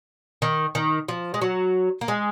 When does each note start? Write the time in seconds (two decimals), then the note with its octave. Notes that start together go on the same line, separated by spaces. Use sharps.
0.42 D#3
0.75 D#3
1.08 F3
1.34 G#3
1.42 F#3
2.01 A#3
2.08 G#3